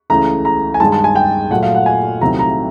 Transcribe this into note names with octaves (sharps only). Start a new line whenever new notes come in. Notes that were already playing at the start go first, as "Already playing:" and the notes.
C#2 C#3 E3 A3 A#5
A#5
G#5
G2 D#3 G#3 A5
A5
G#5
G5
A#2 F#3 A3 F#5
F5
F#5
G#5
C2 C3 D#3 F#3 A3 A#5
A#5